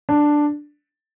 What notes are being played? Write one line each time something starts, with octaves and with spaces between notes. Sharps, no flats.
D4